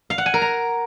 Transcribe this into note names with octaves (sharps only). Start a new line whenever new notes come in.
F5
F#5
G#5
A#4
A#5